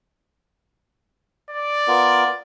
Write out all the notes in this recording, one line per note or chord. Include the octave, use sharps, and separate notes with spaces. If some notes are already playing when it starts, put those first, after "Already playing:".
D5
B3 F4 A#4